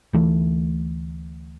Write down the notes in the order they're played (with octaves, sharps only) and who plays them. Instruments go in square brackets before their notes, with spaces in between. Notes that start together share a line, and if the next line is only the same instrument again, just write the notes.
[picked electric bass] D2 E3 A3